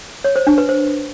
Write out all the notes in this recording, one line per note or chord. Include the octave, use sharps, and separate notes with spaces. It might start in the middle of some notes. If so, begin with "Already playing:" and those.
C#5
C5
D4
B4
C5